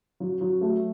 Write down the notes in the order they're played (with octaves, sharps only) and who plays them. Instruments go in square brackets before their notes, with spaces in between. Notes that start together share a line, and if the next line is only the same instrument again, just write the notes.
[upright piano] F#3
F#3
A3